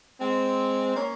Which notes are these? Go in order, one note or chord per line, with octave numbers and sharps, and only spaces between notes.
G#3 C4
A#3 C#4